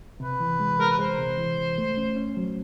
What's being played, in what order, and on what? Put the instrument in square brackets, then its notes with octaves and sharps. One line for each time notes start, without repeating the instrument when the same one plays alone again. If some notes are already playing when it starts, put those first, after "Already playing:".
[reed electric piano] C3 [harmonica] B4
[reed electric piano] E3
G#3
[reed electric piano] G#3 [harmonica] A#4
[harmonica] B4
[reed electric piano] G#3 [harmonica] C5
[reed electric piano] C3
E3
C2
A3
C#4
C#4
F#3